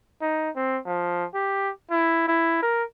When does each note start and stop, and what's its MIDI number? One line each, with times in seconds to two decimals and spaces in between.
0.21 0.50 63
0.56 0.78 60
0.86 1.25 53
1.34 1.71 67
1.91 2.27 64
2.28 2.61 64
2.62 2.83 70